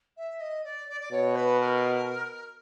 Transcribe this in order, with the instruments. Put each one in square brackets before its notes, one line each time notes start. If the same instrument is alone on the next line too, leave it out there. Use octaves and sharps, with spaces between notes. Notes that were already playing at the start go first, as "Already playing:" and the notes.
[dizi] E5
D#5
D5
D5
D5
[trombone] B2 [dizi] C#5
[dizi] B4
A#4